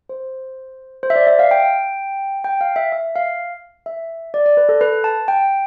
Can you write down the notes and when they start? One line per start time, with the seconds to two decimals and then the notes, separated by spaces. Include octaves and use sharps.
0.09 C5
1.03 C5
1.10 E5
1.16 D5
1.27 E5
1.39 F5
1.51 G5
2.44 G5
2.61 F5
2.76 E5
2.92 E5
3.16 F5
3.86 E5
4.34 D5
4.46 D5
4.57 B4
4.69 A4
4.81 B4
5.04 A5
5.28 G5